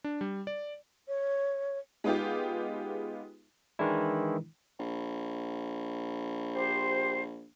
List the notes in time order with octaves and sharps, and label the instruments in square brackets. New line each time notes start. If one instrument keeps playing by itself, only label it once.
[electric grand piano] D4
G3
D5
[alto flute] C#5
[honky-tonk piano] G#3 B3 D#4 F4 G4
[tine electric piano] D#3 E3 G#3 D4 E4
[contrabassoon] A#1
[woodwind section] G4 C5